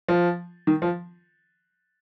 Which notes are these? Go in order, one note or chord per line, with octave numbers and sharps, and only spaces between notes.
F3
D#3
F3